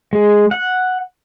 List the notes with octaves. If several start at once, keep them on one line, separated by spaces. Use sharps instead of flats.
G#3
F#5